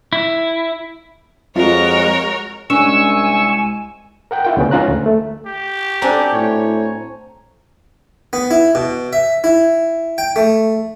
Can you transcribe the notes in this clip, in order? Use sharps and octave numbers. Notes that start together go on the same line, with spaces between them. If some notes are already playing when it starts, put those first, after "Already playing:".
E4
F2 G#3 F4 F#4 A#4 C#5
C2 G#3 C#4 D4 G#5 C#6 E6
A#4 F#5 G5
E4 F4 G5
D2 C#3 B3 C#4
G#2 F3 C#4 F4 A#5 F#6
D2
A3
G4
C4 D4 F#4 C5 G#5 A#5
A2 C#5
B3
E4
B2
E5
E4
G5
A3